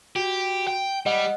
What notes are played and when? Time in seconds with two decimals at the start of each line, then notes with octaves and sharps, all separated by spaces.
0.16 F#4 G4
0.67 G5
1.06 G3 D#5 F#5